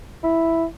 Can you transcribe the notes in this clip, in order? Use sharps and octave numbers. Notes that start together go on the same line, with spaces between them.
E4